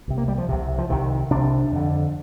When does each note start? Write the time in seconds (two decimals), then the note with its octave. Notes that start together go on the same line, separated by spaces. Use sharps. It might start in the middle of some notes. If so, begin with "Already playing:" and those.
0.08 C2 C3
0.18 A#3
0.28 G3
0.38 F3
0.49 C2 C3
0.78 F3
0.89 C2 C3 D#3
1.31 C2 C3 D4
1.72 F2 D3